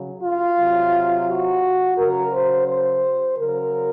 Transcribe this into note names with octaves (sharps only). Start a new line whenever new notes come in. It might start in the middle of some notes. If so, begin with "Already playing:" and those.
Already playing: C#3 F#3
F4
C3 F#3
F#4
C#3 F#3 A#4
C5
C5
C#3 F#3 A#4